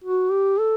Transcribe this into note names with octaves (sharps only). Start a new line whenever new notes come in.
F#4
G4
A4